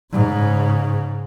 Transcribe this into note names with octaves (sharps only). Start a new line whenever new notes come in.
G#2 C#3